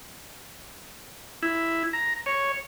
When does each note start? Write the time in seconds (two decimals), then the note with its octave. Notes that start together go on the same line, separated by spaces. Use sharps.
1.43 E4
1.93 A#5
2.26 C#5